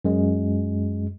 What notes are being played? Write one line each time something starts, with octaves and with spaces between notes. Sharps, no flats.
F#2 G#3